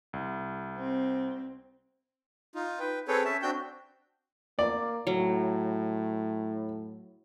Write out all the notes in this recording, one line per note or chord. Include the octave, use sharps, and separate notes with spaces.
C2
C4
D#4 F4
B4 G5
C4 G#4 A4 B4 C#5 G5
C#4 E5 A5
C4 D4 F#4 G5 G6
A#3 D5
A2 F#3